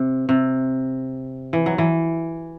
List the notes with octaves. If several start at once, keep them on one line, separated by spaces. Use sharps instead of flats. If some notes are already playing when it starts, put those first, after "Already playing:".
Already playing: C3
C3
E3
F#3
E3